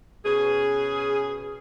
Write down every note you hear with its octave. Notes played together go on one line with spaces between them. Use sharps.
B2 C#4 G#4